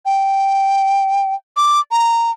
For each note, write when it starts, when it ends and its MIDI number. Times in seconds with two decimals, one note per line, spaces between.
0.06 1.34 79
1.57 1.80 86
1.91 2.31 82